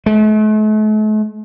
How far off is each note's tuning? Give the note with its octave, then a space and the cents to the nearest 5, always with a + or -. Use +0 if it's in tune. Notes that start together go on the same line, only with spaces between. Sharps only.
A3 -45